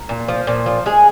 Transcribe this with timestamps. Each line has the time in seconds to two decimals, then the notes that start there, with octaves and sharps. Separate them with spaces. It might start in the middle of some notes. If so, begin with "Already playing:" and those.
Already playing: A#4
0.09 A#2
0.28 F3
0.47 A#2
0.66 F3
0.86 G#3 G#4